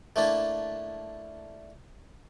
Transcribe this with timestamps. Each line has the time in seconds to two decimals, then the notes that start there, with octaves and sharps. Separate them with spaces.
0.16 A3 A#3 D4 E4